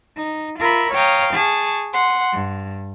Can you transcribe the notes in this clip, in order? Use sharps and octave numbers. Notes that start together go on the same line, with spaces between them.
D#4
F4 A#4 E5 B5
C#5 F5 G5 A#5 D#6
G#4 A5 C#6
F#5 C6
G2